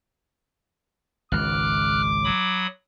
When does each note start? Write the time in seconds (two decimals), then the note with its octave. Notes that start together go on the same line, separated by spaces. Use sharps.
1.32 G#1 C#2 D6 F6 F#6
2.24 F#3 B5 D#6